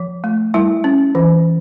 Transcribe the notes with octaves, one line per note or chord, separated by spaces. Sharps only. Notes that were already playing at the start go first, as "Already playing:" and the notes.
Already playing: F3
A3
G3 E4
C#4
E3